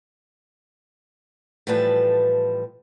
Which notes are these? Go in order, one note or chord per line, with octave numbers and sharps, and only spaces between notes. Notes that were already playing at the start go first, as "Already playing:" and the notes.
A2 E3 F3 G3 B4 A5